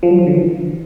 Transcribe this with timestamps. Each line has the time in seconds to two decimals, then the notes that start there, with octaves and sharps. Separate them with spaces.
0.03 F3
0.11 F#3
0.19 F3
0.27 D3
0.35 E3